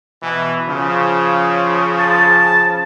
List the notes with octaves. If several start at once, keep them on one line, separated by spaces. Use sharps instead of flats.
B2 E3
C#3 F3
A5